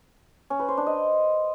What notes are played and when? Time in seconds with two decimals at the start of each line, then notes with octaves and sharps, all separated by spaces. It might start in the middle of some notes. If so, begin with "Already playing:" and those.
0.50 C#4
0.59 B4
0.68 C5
0.77 D4
0.87 D#5